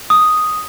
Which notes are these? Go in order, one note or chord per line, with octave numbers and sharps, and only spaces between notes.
D#6